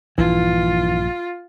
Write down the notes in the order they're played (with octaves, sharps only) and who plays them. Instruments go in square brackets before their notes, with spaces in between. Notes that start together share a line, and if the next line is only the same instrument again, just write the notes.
[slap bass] A#1 G2 [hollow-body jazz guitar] E3 [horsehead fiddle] F4